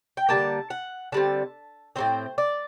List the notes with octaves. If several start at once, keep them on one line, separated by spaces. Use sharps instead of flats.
G5
D3 G3 A#3 A5
F#5
D3 G3 C4 A5
A2 G3 C4 C5
D5